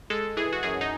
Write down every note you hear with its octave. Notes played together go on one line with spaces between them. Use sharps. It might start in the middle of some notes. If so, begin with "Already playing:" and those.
G#3 A4
E3 G#4
F#4
F#2 G#4
D#4